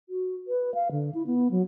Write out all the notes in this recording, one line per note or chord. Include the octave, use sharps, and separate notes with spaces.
F#4
B4
F5
D3
E4
B3
F#3